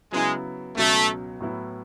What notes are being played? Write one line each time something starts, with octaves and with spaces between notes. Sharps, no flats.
C#3 F#3 G#3 B3 E4
C#2 B2 F#3 A3
A2 F#3 B3 E4